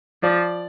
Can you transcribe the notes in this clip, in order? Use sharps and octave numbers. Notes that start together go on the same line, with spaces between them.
F3 D5